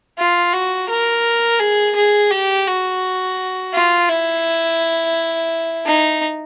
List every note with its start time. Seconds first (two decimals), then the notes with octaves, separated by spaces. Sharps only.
0.18 F4
0.53 F#4
0.89 A#4
1.60 G#4
1.96 G#4
2.31 G4
2.67 F#4
3.73 F4
4.08 E4
5.86 D#4